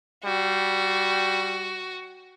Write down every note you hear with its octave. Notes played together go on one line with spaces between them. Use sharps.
G3 F#4